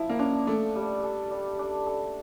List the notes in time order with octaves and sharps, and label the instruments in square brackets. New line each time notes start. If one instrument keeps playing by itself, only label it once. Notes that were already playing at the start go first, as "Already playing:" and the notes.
Already playing: [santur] F3 [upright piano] E4
[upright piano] A#3
[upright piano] C#4 [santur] D4
[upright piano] A3 [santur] D5
[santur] G3
A4
G3
D4
A4